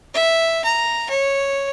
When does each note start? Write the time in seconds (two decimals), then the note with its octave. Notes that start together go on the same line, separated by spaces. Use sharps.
0.14 E5
0.64 A#5
1.10 C#5